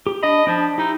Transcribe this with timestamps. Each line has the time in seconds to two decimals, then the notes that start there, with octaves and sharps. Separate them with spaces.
0.07 G4
0.23 D4 D#5 B5
0.47 F3 D4 B5
0.78 D#4 E4 G4